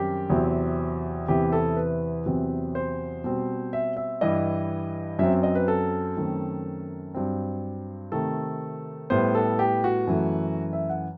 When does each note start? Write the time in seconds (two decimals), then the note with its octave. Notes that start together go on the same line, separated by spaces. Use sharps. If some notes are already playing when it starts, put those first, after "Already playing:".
Already playing: F#2 D#3 G3 C4 G4
0.30 E2 C3 F#3 C4
1.28 E2 C3 E3 G4
1.52 A4
1.76 B4
2.26 E2 C3 F#3 C4
2.75 C5
3.24 B2 G3 C4
3.73 E5
3.97 E5
4.21 G2 E3 G3 D#5
5.19 F#2 F#3 C4 E5
5.43 D#5
5.55 B4
5.68 A4
6.17 F#2 D#3 A3 C4
7.14 G2 F#3 C4
8.12 C3 D#3 A3 A4
9.10 A2 G3 B3 C5
9.35 A4
9.59 G4
9.84 F#4
10.07 F#2 E3 A3
10.73 E5
10.89 F#5